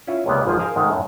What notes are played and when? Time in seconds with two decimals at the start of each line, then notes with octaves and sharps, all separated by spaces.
0.07 C#4 E4 F4
0.26 C#2 C3 A#3 B3 D5
0.45 G#1 G#2 F3 G#4
0.59 G#4 A#4 C5 F5 G#5 A#5
0.76 G#2 D#3 G#3 A3
0.90 F#2 A2